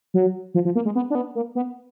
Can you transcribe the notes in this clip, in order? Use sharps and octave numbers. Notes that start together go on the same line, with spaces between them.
F#3
F3
F3
A#3
G#3
B3
D4
B3
A#3
B3